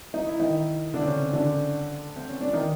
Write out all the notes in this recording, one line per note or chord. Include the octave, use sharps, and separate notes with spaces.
D#4
E4
D#3 D#4
D3 D4
C4
C#3 C#4
D3 D4
C4
C#4
D4
D#3 D#4